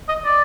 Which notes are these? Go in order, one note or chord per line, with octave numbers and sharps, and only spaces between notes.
D#5
D5